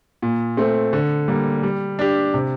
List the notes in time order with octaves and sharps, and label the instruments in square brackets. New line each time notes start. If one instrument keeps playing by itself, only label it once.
[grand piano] A#2
A3 C4
D3
G3 A#3
G3
D4 G4
C3